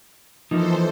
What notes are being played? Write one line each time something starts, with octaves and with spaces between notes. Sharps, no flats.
E3 F3 A#3 D#4 A4 C5